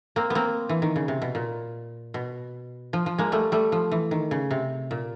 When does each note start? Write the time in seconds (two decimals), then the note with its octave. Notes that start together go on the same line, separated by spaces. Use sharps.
0.16 A#3 C4
0.30 B3
0.35 A#3 C4
0.69 E3
0.82 D#3
0.96 C#3
1.08 C3
1.22 B2
1.35 A#2
2.14 B2
2.93 F3
3.06 F3
3.18 G#3 A#3
3.32 G3 A3
3.52 G3 A3
3.72 F3
3.91 E3
4.11 D#3
4.31 C#3
4.51 C3
4.91 A#2